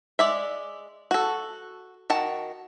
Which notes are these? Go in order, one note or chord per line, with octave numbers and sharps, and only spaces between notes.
G#3 D5 E5
F#4 A4
D#3 F#4 A5